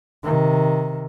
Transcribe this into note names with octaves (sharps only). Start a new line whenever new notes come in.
C3 D#3